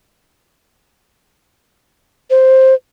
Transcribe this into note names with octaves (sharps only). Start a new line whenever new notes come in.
C5